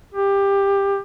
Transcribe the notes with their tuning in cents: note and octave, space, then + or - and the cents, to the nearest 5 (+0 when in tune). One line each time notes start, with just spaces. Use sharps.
G4 +20